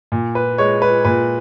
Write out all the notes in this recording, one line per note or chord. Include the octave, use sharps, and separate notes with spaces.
A#2
B4
G#3 C#5
B4
A#2 B4